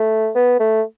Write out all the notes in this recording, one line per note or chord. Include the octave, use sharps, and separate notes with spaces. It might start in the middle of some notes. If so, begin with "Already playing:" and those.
Already playing: A3
B3
A3